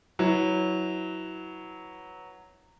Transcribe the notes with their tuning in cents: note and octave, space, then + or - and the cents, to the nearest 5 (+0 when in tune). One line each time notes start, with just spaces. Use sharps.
F#3 +0 E4 -25 B4 +0